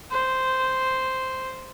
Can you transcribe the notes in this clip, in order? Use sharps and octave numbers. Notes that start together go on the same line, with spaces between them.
C5